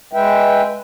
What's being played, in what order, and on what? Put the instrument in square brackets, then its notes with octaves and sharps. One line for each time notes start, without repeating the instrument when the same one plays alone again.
[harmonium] G#3 B4 E5 G5